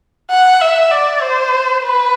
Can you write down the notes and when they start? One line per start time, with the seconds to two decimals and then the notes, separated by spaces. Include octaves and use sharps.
0.31 F#5
0.61 E5
0.91 D5
1.22 C5
1.84 B4